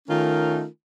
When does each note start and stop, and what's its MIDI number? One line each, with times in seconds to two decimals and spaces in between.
0.08 0.65 51
0.08 0.65 57
0.08 0.65 61
0.08 0.65 63
0.08 0.65 65
0.08 0.65 70